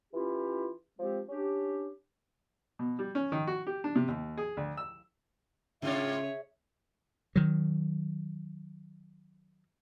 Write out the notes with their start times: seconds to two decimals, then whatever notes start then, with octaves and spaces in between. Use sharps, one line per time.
0.14 E3 C#4 E4 F4 G4
0.99 F3 G#3 C4 G4
1.28 C#4 D4 G4
2.79 B2
2.99 G3
3.15 C#4
3.32 D#3
3.47 F#4
3.67 G4
3.84 D4
3.95 C3
4.08 D#2
4.38 G#4
4.57 D2
4.77 E6
5.82 G#2 C#3 D4 F4 G#4 C#5 E5
7.36 D#3 F#3